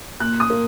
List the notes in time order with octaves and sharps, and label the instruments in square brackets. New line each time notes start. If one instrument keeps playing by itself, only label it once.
[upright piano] A#2 F#6
D#6
A#3